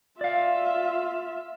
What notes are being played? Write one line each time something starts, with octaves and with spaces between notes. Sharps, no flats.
F4 D5 E5 F5